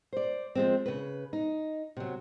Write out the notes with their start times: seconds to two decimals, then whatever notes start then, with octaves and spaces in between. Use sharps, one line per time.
0.13 C5 D5
0.55 F3 G#3 C4
0.86 C#3 B4
1.33 D#4
1.97 C3 F#3